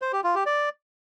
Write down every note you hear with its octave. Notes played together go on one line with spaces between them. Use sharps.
C5
G4
F4
G4
D5